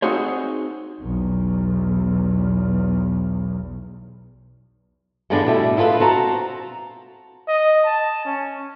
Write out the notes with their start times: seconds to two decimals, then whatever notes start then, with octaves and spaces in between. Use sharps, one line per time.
0.02 C4 D#4 F#4 G#4 C5 C#5
1.01 B1 E2
5.30 G2 D3 E3 G#3 B3 D4
5.46 B2 G3 A3
5.77 G#3 E4 F4 A4 B4
6.00 C4 F#4 A5 A#5
7.48 D#5
7.85 A5
8.25 C#4